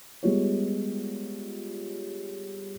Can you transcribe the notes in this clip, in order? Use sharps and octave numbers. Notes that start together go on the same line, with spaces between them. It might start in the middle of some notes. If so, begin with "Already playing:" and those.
G3 G#3 B3 F4 G4 C#5